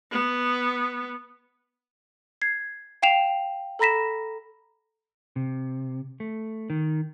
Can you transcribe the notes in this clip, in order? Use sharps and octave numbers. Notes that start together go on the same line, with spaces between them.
B3
G#6 C7
F5 G5 C7 E7 F7
A4 A#5 B5 A#6 B6 E7
C3
A3
D#3